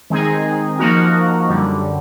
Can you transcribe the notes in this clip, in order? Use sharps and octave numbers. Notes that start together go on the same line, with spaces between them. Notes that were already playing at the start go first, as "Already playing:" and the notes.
D#3 G#3 C4 D#4 G#4
F3 A#3 D#4 F#4 A#4
F#2 D3 G3